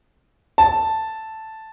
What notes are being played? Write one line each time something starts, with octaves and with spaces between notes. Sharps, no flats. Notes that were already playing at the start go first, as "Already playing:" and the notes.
A5